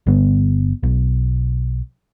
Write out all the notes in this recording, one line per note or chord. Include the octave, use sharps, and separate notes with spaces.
G1 G2 D3 B3
B1